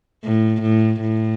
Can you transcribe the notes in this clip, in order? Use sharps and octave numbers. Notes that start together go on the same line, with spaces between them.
A2
A2
A2